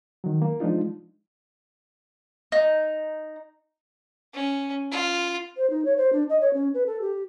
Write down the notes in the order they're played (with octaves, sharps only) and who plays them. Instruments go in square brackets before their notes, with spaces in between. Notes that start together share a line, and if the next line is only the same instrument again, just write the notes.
[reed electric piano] D#3 F#3
A#3
F3 G#3 D4 D#4 F4
[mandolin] D#4
[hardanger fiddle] C#4
F4
[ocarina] C5
D#4
C#5
C5
D4
D#5
C#5
C#4
B4
A4
G4